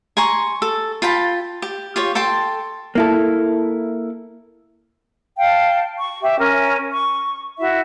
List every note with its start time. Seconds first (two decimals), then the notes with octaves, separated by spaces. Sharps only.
0.17 G#5 A#5 C6 C#6
0.62 A4
1.02 F4 G5 A5 B5
1.62 G4
1.96 F4 G4 C#5
2.15 A4 G5 A5 C6
2.95 A#3 E4 A4
5.39 F5 G5 A5
5.99 C#6
6.22 G4 E5
6.39 C#4 A#4 G#5
6.91 C#6
7.58 E4 F#4 E5